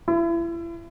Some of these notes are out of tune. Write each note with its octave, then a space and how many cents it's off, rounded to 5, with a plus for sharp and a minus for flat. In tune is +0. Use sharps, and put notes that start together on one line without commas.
E4 +35